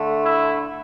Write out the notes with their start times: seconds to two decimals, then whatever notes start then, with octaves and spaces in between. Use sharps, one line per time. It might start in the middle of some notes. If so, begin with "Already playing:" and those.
Already playing: D3 A3
0.25 E4